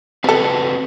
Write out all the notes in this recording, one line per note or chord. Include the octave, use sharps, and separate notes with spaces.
F3 C4 F#4 A4 B4